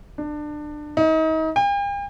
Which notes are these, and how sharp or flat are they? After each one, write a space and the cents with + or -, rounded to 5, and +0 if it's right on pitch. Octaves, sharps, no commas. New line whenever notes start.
D4 +25
D#4 +35
G5 +45